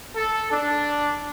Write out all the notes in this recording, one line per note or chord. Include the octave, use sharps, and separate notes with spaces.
A4
D4